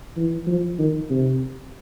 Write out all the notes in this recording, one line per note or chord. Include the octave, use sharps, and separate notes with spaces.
E3
F3
D#3
C3